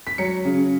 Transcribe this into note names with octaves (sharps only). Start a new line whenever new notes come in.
B6
F#3 C#7
C#3